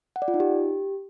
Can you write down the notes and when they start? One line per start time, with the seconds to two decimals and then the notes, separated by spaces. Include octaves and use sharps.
0.16 F#5
0.22 D5
0.28 F4
0.34 D#4
0.40 G4